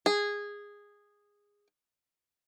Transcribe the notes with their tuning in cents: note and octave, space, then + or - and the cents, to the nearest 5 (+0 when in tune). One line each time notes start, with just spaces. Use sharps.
G#4 -15